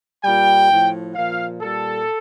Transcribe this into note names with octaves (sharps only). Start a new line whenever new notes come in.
A#2 G3 G5
A2 F3
A#2 F3 F5
A#2 G3 A4